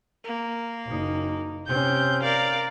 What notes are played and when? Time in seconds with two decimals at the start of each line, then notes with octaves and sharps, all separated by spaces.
0.25 A#3
0.87 F#1 D#4
1.67 C3 C4 C#4 G6
2.23 A#4 D5 F5